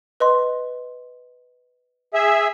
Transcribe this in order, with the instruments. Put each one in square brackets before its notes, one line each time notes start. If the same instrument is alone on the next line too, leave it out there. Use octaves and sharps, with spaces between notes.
[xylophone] B4 D#5 C6
[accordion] G#4 E5